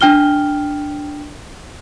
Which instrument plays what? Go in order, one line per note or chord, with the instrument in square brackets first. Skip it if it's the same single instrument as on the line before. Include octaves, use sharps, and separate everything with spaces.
[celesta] D4 G5 F6 G7